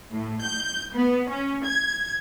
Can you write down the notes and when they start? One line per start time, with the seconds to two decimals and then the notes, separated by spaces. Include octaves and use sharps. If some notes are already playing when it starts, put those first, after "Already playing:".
0.11 A2
0.44 G6
0.94 B3
1.30 C#4
1.65 G#6